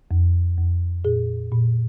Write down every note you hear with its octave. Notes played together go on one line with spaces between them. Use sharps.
F2
F2
A#2 G#4
A#2